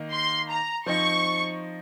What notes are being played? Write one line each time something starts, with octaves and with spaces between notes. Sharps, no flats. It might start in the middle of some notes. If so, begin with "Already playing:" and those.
Already playing: D#3 A#3 D#4
C6
A#5
F3 C4 D#4 C#6